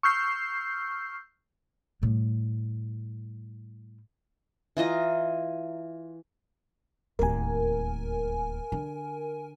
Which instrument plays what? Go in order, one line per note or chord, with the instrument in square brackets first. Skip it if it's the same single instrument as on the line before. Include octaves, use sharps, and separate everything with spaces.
[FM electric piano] C#6 E6 F6 G6 C7
[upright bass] A2 G3
[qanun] E3 F4 D#5 A#5
[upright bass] D1 D#2 [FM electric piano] A#4 G#5
[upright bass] D3